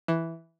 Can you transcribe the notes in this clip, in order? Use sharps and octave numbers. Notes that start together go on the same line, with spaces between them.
E3